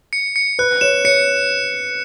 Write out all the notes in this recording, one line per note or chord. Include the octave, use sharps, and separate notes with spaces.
C#7
C#7
B4 F#6
C#5 E7
C#5 C#7